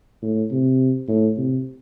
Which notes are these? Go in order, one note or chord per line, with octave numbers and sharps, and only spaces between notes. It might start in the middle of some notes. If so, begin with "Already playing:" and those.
A2
C3
A2
C3